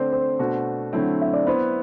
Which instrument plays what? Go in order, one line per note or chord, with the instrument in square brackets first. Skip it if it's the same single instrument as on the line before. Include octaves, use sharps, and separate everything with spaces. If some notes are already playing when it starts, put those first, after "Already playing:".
Already playing: [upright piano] D3 A3 C4 [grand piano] C5 D5
[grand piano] C5
[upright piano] B2 A3 D4 F#4
D3 F#3 A3 C4 E4
[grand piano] E5
D5
[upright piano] B3 E4 B4 [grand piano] C5